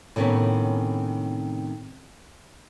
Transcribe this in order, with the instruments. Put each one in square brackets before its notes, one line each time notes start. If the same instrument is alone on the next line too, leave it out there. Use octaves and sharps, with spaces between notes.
[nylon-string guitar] A2 C3 D#3 G#3 B3 C#4